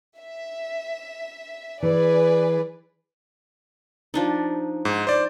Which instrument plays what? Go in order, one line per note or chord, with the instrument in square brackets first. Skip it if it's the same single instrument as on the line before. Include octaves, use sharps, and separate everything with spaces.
[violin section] E5
[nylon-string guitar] E3 [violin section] G#4 B4 D5
[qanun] F3 D4 D#4
[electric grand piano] G#2
C5 D5